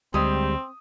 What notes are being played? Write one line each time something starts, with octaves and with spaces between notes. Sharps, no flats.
D2 G3 G#3 C4 D#6